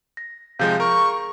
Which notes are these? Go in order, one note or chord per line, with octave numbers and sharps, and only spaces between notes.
A#6
C3 F3 G#3 G#4 F5 G6
A#4 C#6